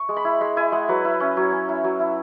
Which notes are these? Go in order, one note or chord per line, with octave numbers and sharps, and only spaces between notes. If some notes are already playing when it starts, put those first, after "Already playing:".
Already playing: C#6
G#3
B5
E4
G#3 B5
E4 G#5
G#3 F#5
F#3 B4
E4
C#4
F#3 C#5
C#4
E4
F#3
E4